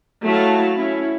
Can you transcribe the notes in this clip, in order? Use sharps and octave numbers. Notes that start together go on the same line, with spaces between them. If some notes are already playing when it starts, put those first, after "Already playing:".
F#3 A3 E4 F#4 F5 A5
C#4 E4